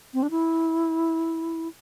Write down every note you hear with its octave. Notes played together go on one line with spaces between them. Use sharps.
C4
D4
E4